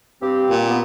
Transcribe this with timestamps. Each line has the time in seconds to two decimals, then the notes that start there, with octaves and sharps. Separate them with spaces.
0.22 G2 C4 G4
0.50 A#2
0.69 B3